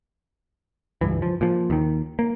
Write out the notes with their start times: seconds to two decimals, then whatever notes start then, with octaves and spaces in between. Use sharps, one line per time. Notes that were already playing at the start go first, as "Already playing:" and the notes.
1.01 C#2 G2 E3
1.22 F3
1.41 A#2 F3
1.70 D#2 D#3
2.19 A#3